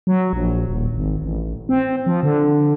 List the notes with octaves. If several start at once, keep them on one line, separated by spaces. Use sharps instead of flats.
F#3
A#1
D#1
G#1
A1
C4
F3
D3